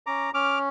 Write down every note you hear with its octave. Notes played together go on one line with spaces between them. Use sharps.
C#4 A#5 D6
C#4 D6 F6